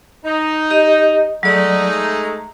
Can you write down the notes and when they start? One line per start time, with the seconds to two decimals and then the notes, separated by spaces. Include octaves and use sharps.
0.25 D#4
0.71 G4 D#5
1.43 F#3 G#3 A3 D#4 D5
1.93 A#5